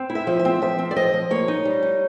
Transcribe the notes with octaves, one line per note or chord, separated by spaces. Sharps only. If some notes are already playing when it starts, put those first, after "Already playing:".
Already playing: C4
E4
E5
F3
E5
C4
F3 E5
C4
D5
F3 D#5
F3
A#3 C#5
D#4
G3
D#4